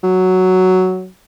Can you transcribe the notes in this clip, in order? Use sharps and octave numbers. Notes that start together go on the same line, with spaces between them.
F#3